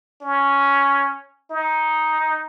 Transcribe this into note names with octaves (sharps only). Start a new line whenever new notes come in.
C#4
D#4